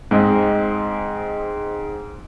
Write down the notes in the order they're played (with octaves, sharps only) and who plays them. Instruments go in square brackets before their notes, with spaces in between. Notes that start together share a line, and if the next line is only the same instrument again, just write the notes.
[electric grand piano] G#2 G#3 C4 D#5